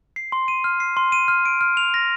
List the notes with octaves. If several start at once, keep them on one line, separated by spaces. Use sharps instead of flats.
C7
C6
D#7
F6
C7
C6
D#7
F6
D7
F6
F7
A#6